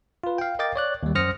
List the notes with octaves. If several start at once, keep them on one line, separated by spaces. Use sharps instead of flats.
F4 B4
F5 G5
A#4 D#5 F5 G5 D6 A6
C#5 D5 F#6
D#2 G3
F#2 C5 D#6 F6 A#6 C#7